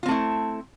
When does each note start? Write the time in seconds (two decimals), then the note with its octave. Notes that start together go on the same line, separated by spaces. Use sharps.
0.03 F4
0.06 C4
0.08 A3
0.11 E4